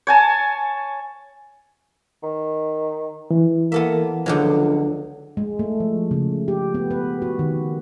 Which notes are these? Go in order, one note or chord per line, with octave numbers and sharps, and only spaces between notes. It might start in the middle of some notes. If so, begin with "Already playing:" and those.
C#5 G#5 A5
D#3
E3
A#3 B3 A4 E5
C#2 D3 F3 F#3
G#3
A3
F3
C#3
G4
B3
B4
F#4
D#3